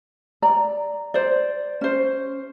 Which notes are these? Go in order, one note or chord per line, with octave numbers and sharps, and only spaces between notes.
D5 A#5
C5 D5
C#4 C5